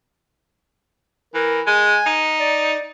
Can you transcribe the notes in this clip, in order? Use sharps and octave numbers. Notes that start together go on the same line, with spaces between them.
E3 A#4
G#3 G#5
D#4
D5